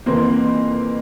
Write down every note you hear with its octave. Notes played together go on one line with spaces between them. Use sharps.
F2 C3 E3 A#3 C4